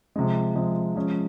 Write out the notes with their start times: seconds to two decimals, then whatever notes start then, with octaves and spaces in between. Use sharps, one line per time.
0.16 C3 F3 G#3
0.55 C3 F3 G#3
0.96 F3 G#3 C#4